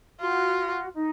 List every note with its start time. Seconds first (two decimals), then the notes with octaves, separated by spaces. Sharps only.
0.21 F4 F#4
0.94 D#4